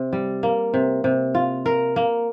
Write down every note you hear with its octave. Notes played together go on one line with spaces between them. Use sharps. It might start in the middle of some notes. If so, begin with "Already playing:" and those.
Already playing: C3
G3
A#3
C3
C3
F4
A#4
A#3